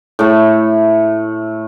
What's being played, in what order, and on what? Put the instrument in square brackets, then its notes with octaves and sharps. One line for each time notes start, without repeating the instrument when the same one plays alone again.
[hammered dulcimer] A2 A3